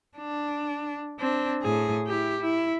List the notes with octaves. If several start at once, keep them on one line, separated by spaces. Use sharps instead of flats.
D4
C4 D4
A2 G#4
E4 G4
E4